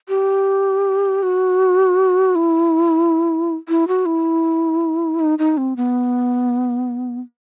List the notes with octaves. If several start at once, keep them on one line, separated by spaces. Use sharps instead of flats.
G4
F#4
E4
E4
F#4
E4
D#4
D#4
C4
B3